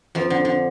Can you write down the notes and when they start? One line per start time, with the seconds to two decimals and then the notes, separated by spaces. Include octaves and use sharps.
0.15 F2 F3
0.30 D3
0.45 D3